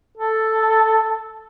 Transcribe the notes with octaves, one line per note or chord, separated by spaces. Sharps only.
A4